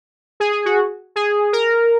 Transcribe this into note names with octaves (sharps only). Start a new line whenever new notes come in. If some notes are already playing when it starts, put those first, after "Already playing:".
G#4
G#4
F#4
G#4
A#4